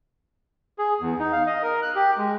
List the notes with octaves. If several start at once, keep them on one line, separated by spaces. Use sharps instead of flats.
G#4
E2
D#4
F5
D#5
A#4
F#6
G4
G#3